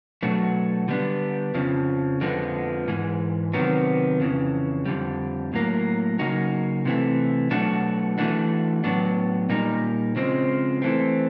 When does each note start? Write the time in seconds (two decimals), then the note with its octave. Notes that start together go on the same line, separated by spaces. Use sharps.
0.23 B2 F#3 A3 D4 F#4
0.88 D3 G3 B3 D4
1.54 F2 C#3 F3
2.21 F2 D3 F3 G#3 B3
2.88 G#2 E3 G#3
3.53 C3 D#3 F#3 B3
4.20 F2 C#3 E3
4.86 F2 D3 G3
5.53 A2 F#3 A#3
6.19 C#3 F#3 A#3 D#4 F#4
6.85 C3 E3 A3
7.51 B2 F#3 A3 D4 F#4
8.18 E3 A3 D4 F#4
8.84 A2 F#3 B3 D4
9.49 A#2 G3 A#3 D#4
10.16 C#3 F3 G#3 C4
10.82 E3 A3 C4